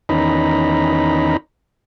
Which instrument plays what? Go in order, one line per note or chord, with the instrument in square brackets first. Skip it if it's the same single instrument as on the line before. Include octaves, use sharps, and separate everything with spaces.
[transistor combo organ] E2 D#3 C#4 D#4 A#5 B5